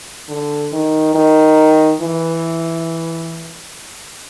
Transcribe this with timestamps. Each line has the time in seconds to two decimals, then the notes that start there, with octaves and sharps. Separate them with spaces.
0.28 D3
0.72 D#3
1.15 D#3
2.00 E3